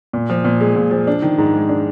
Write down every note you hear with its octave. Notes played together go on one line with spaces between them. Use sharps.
A#2
F3
A#2
G#3
A#2
F3
D4
D#3
G#2
G#3
D4